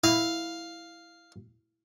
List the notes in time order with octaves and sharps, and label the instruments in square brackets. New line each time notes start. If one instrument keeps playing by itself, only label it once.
[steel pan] E4 [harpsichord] F5